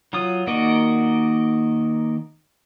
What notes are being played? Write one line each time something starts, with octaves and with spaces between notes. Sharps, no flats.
F#3 F4 D#6
D#3 A#3 F#4 D5 D#5